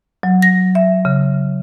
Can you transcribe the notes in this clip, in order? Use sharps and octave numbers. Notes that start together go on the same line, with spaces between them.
F#3
A#6
E5
C#3